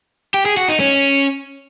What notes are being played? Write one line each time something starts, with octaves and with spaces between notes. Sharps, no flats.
G4
G#4
F#4
D#4
C#4